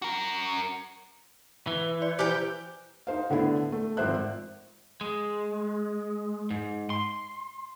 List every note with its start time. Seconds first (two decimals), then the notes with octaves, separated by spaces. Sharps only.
0.02 F#4 A#4
1.67 E3
2.02 D5
2.19 G4 C5 G5 G#5 F#6
3.07 D#4 C5 F5
3.30 A2 D3 B3 D4 E4
3.72 A3
3.97 G#1 F3 C5 E5 F#6
5.01 G#3
6.51 G#2
6.90 C6